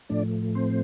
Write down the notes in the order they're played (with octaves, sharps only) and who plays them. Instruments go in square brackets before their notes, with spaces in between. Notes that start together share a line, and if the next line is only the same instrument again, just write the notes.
[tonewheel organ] A2 F3 A3 D4 D5
C4 C5